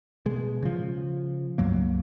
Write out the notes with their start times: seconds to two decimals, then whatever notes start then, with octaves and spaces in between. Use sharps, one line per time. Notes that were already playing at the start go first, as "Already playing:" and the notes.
0.26 B2 G#3
0.63 C#3 F3
1.58 C#2 G2 F#3 A#3